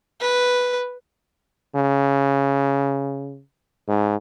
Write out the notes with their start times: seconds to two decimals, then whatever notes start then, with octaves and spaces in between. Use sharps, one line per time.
0.21 B4
1.75 C#3
3.87 G#2